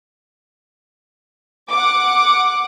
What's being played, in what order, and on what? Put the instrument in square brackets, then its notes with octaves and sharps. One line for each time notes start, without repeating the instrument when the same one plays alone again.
[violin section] F#5 D6